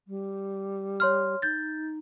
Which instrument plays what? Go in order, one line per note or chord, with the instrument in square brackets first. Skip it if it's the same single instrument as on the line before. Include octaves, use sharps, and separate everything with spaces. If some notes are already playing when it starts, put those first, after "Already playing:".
[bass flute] G3
[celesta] C#5 C6 F6
[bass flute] D#4 [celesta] G6 A6